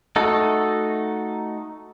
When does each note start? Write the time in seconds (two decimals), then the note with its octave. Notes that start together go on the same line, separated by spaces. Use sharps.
0.16 A3 D#4 F#4 A4